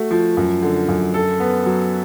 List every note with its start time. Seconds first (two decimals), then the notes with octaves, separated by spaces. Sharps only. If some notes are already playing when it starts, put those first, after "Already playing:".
Already playing: A3 F#4
0.11 F3
0.37 F#2
0.62 D3
0.88 F#2
1.14 A4
1.40 B3
1.66 F#3